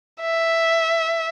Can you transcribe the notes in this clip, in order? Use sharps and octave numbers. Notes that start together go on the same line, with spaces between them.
E5